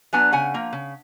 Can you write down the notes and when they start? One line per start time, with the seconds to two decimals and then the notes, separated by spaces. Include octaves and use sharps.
0.13 F#3 B3 D4 G#5
0.32 C#3 F#5 G#5
0.54 F3 A#3
0.73 C#3